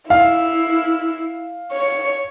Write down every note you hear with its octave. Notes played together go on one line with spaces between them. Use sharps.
E4 F5
C#5